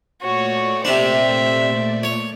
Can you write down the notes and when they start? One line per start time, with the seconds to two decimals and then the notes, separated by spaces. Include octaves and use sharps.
0.22 A#2 A3 F#4 C#5 D5
0.85 C3 D4 C5 E5
2.03 C#5